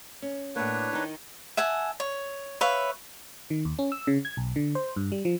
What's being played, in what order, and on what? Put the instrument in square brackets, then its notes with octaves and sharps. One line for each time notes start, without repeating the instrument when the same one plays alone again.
[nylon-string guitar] C#4
[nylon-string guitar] A2 A#3 [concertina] D4 B4 C#5
[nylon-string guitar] D#3 D#4
[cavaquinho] E5 F#5 G#5 A5
C#5
B4 C#5 E5 F5
[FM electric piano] D#3
D#2
C#4
E6
C#3
G#6
B1
D3
C5
G2
G3
F3